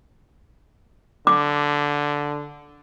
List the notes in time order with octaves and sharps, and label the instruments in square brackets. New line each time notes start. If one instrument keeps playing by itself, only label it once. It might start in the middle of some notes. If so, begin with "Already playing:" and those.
[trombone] D3 [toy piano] D6